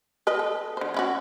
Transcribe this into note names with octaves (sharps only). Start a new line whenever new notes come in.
A#4 B4 D#5
A4
D3 C5
C#4 E4 F#4